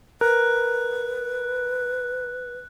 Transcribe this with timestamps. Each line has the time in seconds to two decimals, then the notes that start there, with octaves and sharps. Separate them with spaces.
0.21 A#4 B4 F#6